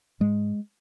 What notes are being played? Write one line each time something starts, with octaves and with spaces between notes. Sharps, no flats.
G#2 G#3